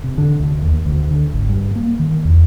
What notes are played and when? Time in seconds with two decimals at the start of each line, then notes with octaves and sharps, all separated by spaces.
0.04 C3
0.18 D3
0.40 D2
0.62 D#2
0.86 D2
1.11 D3
1.34 G#1
1.49 G2
1.75 A#3
1.99 D#3
2.25 E2